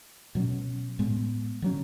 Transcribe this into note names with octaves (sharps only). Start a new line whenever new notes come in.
B2 F#3 C#4
A2 G#3 B3
D3 F#3 C#4